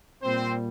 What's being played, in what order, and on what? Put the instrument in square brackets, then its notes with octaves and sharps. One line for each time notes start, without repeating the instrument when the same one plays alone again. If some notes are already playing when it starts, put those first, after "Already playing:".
[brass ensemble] A#2 G3 C4 C5